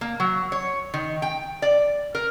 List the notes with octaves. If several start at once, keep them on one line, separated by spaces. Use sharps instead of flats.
A#3
F#3
C#5
D#3
G5
D5
A#4